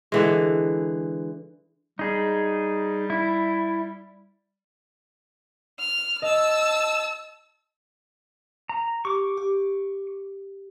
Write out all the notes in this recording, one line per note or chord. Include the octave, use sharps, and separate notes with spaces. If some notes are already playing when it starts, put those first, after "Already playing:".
D3 E3 G#3
G3 D#4 G#4
E4
F6
D#5 A5 E6
A#5
G4 C#6 D6
G4